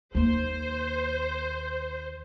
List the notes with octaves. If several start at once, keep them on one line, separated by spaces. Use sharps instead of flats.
D#2 A#3 C5